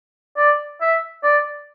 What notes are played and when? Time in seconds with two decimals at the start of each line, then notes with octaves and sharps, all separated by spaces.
0.37 D5
0.81 E5
1.23 D5